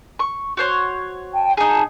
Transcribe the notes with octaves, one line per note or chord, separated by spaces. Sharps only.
C#6
F#4 C5 C#5
G5 A5
D#4 G#4 A5 A#5